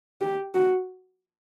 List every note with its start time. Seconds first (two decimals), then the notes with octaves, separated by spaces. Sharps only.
0.21 G4
0.55 F#4